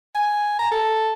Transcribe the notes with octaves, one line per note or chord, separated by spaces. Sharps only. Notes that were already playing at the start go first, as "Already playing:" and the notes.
G#5
A#5
A4